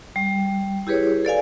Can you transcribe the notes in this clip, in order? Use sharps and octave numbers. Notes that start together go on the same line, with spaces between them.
G3
E4 G4 G#4 B4 C#5
A4 D5 F5 G#5